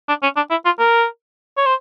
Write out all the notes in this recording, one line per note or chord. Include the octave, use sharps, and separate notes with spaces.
D4
C#4
D4
E4
F4
A#4
C#5
C5